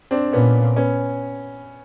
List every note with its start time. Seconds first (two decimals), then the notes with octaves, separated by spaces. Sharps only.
0.11 C4 D4
0.33 A#2 B3 C#4
0.76 B3 C#4